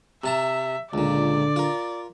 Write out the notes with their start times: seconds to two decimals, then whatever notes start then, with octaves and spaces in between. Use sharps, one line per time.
0.24 C3 E5 A5 A#5
0.94 C#2 A#2 D3 D5
1.56 F4 A#4